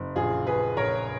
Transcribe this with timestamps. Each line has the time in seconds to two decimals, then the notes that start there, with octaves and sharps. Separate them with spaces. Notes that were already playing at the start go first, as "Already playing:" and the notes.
Already playing: F#1
0.16 A#1 F4 G#4
0.47 F3 G#4 B4
0.77 A#1 A#4 C#5